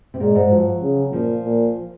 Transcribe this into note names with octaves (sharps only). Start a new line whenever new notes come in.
C3
A#2 G#3
G#2
F3 F#3
C#3
A#2 F3
A#2